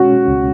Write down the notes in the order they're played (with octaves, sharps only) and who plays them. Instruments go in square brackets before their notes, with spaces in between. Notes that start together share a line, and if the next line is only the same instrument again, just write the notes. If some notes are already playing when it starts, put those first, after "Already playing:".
Already playing: [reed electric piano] B2 G#3 C#4 [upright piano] F#4
[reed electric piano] C#2